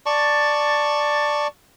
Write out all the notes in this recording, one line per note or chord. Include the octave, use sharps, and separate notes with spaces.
D5 A5 C#6